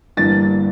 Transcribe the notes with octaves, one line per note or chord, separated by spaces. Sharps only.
G1 G2 E3 A#3 D4 A6